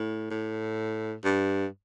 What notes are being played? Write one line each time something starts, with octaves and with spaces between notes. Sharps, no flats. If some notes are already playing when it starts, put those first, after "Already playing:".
Already playing: A2
A2
G2